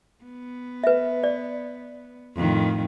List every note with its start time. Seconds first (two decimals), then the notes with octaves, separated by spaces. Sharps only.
0.24 B3
0.84 B4 E5
1.24 D5
2.35 F2 A2 D#3